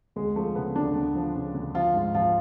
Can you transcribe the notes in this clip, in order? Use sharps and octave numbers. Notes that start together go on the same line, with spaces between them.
D2 G#3
F3 A3
C#3 B3
D2 D4
D2
F3
C#3
D2
F3 F4
G#2
F3 F4